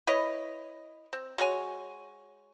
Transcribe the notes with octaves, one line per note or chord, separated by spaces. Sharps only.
E4 B4 C#5 D#5
C4
G#3 F#4 C#5 G#5